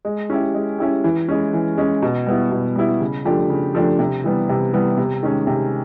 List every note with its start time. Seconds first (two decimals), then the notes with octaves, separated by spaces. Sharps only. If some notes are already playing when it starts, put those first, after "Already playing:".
0.05 G#3
0.30 C#4 E4 G4
0.54 G#3
0.79 C#4 E4 G4
1.04 E3
1.28 G#3 C#4
1.53 E3
1.78 G#3 C#4
2.02 B2
2.26 G3 B3 E4
2.52 B2
2.76 G3 B3 E4
3.01 C#3
3.25 F3 A3 D4 G4
3.50 C#3
3.75 F3 A3 D4 G4
3.99 C3
4.24 E3 G3 B3
4.49 C3
4.73 E3 G3 B3
4.98 C3
5.23 D#3 G#3 C#4
5.47 C3